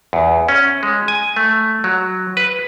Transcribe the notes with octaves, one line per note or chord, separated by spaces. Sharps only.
E2
C#4
G#3
G#5
A3
F#3
B4